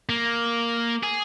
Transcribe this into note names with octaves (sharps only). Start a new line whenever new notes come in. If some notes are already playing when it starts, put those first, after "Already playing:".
A#3
G#4